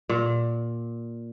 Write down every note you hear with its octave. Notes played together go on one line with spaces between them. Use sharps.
A#2